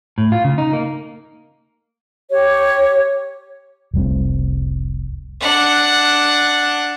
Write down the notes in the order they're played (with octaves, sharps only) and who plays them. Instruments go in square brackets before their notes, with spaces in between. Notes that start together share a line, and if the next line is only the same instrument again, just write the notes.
[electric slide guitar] A2
F4
C#3
D#4
A#3
[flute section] G4 C#5
[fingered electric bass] F1 C2 G3 C4
[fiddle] D4 F#5